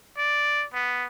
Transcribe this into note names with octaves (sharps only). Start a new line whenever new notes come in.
D5
B3